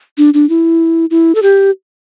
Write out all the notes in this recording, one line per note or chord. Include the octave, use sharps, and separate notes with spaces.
D4
D4
E4
E4
A4
G4